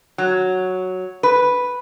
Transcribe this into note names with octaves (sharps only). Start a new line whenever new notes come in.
F#3
B4